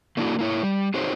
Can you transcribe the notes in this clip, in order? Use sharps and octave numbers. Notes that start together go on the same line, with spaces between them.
A3 A#3 D4 E4 F#4 A4
A#3 E4 C#5
G3
C4 D#4 F#4 G#4 C5 C#5